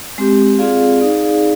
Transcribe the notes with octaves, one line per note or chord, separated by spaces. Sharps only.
G#3 C4 G4
C4 F4 G#4 D5 F5
D#4 G#4 D5 F5